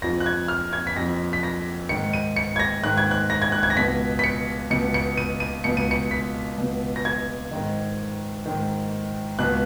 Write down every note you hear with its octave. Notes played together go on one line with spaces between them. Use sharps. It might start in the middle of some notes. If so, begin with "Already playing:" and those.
F2 F3 A#6
F#6
G#6
F6
G#6
B6
F2 F3 A#6
B6
A#6
G#2 D#3 C#7
D#7
C#7
G#6
A#6
G#2 D#3 F#6
G#6
F#6
A#6
G#6
F#6
G#6
A#6
C#2 B2 B6
B6
C#7
C#2 B2 C#7
C#7
D#7
D#7
C#2 B2 C#7
D#7
C#7
B6
C#2 B2
A#6
G#6
G#2 D#3
G#2 D#3
C#2 B2 F#6